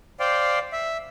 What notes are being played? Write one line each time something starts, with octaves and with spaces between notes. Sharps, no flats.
C5 D5 F5 G5
E5